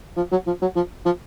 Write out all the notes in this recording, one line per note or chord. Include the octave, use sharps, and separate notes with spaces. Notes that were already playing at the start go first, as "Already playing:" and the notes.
F3
F#3
F3
F#3
F3
F3